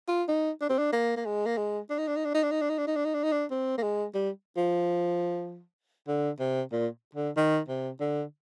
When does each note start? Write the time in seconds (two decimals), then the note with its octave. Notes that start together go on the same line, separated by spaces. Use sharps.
0.08 F4
0.28 D#4
0.61 D4
0.69 C4
0.79 D4
0.93 A#3
1.17 A#3
1.26 G#3
1.46 A#3
1.57 G#3
1.90 D4
1.98 D#4
2.08 D4
2.16 D#4
2.25 D4
2.34 D#4
2.43 D4
2.51 D#4
2.61 D4
2.70 D#4
2.78 D4
2.87 D#4
2.96 D4
3.05 D#4
3.14 D4
3.23 D#4
3.32 D4
3.50 C4
3.78 A#3
3.83 G#3
4.14 G3
4.57 F3
6.08 D3
6.39 C3
6.72 A#2
7.15 D3
7.37 D#3
7.68 C3
8.00 D3